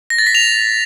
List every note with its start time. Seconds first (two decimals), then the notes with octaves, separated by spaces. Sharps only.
0.10 A#6
0.18 A6
0.27 B6
0.35 F7